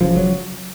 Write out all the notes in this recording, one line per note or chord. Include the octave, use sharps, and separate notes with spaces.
F#1 F#2 C#3 F3
F#3